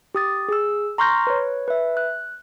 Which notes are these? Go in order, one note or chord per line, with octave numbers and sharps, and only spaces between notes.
G4 D#6 A6
G#4 E6
A#5 C6 C#6 F6 G6 A#6
B4 C#5
B4 E5
F#6